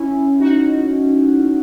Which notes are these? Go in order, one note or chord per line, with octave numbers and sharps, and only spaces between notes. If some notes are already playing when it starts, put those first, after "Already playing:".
Already playing: C#4 E4
D#4 F#4